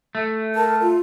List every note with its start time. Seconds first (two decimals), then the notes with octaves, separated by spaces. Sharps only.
0.15 A3
0.55 A#4 A5
0.81 F4